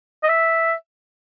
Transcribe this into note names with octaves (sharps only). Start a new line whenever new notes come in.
D#5
E5